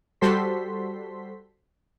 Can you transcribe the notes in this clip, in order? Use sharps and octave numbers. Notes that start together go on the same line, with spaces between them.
G3 F#4 A4 C5 C6 B6